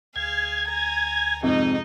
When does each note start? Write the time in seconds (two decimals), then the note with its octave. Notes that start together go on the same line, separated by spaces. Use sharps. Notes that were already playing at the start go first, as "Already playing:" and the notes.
0.16 D2 G#4 F5 G#6
0.68 G#5 A#5
1.43 F2 G#2 C3 D#4 D#5